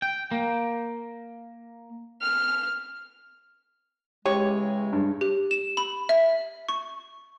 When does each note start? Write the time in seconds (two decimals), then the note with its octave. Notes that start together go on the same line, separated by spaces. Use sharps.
0.02 G5
0.31 A#3
2.22 F6
4.26 C#3 E3 G#3 G4 C#5
4.93 G2
5.21 G4
5.51 E7
5.77 B5
6.09 E5
6.69 C#6